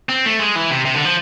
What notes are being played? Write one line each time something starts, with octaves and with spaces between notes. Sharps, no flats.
C4
A3
G#3
E3
C3
C3
D3
F3